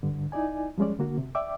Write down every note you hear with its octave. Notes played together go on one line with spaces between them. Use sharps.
G2 D3
D#4 E4 D5 G#5
F3 G3 G#3 C#4 D5
D3 A#3 F#4
C3
D5 E5 G5 D6